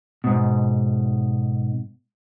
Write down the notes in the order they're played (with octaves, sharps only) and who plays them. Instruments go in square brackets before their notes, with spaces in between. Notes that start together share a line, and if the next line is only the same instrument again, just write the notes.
[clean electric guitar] G#2 B2